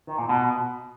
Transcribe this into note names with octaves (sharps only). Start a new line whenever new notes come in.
D#3
A#2
B2